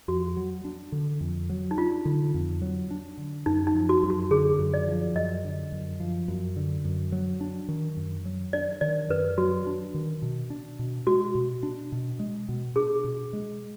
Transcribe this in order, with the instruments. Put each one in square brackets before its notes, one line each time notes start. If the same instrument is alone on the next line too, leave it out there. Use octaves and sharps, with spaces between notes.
[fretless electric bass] F2 [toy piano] F#4
[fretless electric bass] F#3
D4
D3
F2
F#3
[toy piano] D#4
[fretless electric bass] D4 [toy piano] F4
[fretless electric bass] D3
F2
F#3
D4
D3
[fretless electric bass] F#2 [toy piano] D#4
[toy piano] D#4
[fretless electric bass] F3
[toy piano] F#4
[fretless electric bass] F#2
[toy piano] F#4
[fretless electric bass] D3 [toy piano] G#4
[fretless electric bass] F#2
[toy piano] D5
[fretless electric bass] F3
[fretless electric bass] F#2 [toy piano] D#5
[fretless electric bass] D3
F#2
F3
F#2
D3
F#2
F#3
D4
D#3
F#2
F#3
[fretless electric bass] D4 [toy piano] D5
[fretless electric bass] D#3 [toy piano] D5
[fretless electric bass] F#2 [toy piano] B4
[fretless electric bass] F#3 [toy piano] F#4
[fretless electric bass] D4
D#3
B2
D4
B2
[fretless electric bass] G#3 [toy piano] F#4
[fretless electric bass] B2
D4
B2
G#3
B2
[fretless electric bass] D4 [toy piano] G#4
[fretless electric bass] B2
G#3